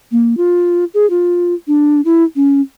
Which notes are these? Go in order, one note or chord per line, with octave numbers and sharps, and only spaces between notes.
A#3
F4
G#4
F4
D4
E4
C#4